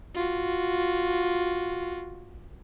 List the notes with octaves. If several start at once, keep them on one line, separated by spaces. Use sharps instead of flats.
F4 F#4